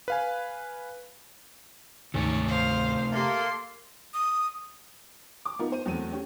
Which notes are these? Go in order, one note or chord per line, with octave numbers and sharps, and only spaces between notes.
B4 F5 G#5
D2 G#2 C3 D#3 A3 C#4 C#5 D5
C5 F5
A#3 G4 A4 E5 C6
D#6
D6
B3 D#4 F4 A#4
C5 D#7
E2 F#3 A3 C4 D#7
C#4 G4